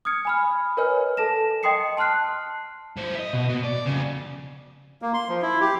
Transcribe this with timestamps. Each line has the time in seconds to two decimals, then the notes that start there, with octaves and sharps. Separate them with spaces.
0.05 D#6 F6 G#6 C#7
0.25 G#5 B5 F6
0.77 A#4 B4 C#5 D#5 G#5 F6
1.17 A4 A5 A#6 E7
1.63 D#5 G5 C6 D#6 C7 C#7
1.97 A5 C6 F6 F#6 C7
2.97 E3 C5
3.15 D#5 E5
3.33 B2
3.49 B2
3.63 D5
3.86 F2 C#3
5.02 A#3
5.14 C6
5.29 F3
5.42 E4
5.61 G4